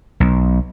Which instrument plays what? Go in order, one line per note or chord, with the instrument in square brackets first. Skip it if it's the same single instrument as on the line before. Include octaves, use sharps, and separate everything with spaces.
[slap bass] B1